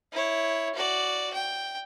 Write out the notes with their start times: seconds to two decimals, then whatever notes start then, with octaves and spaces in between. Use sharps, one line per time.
0.12 E4 C#5
0.74 F#4 D5
1.33 G5